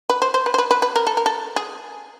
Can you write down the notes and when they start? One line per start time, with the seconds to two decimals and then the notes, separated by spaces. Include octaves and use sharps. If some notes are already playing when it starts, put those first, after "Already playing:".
0.10 B4
0.22 C5
0.34 C5
0.46 B4
0.54 C5
0.58 B4
0.71 B4
0.82 B4
0.96 A#4
1.07 A4
1.17 A#4
1.26 A4
1.56 G#4